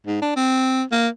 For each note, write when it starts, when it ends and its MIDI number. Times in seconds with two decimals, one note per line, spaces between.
0.07 0.21 44
0.22 0.32 62
0.36 0.83 60
0.92 1.08 58